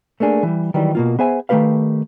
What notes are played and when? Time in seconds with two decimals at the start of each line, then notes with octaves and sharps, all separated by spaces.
0.20 A3 A#3 D4 G#4
0.43 E3 G3
0.74 D#3 E3 F#3 G3
0.95 B2 A#3 F4
1.19 B3 G#4 C5 E5 G#5
1.49 D#3 A3 C4 G4 B4 F5